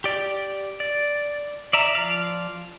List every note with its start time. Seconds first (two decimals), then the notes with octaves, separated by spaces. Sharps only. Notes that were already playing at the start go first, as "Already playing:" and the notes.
0.04 G4 D5
0.80 D5
1.73 D5 E5 A#5
1.95 F3 D5 F5